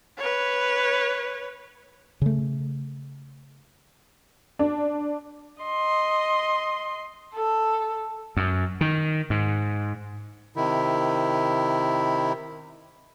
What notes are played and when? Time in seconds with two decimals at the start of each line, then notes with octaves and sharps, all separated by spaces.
0.18 B4 C#5
2.22 C#3 A3
4.59 D4
5.63 D#5 C6
7.35 A4
8.37 F#2
8.81 D#3
9.30 G#2
10.56 C3 D#3 E4